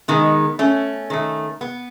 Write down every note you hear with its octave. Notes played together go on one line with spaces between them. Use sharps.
D#3 G#3 B3
A3 C#4
D#3 A3
B3